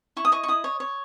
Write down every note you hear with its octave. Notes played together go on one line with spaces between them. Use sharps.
E4 C#6
D#6
D#5 C#6
C#6
E4 D#6
C#5
C#5